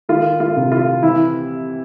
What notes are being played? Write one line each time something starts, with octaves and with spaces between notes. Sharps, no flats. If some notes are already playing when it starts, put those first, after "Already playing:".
D#3 F4
F4
C3
F4
E3 E4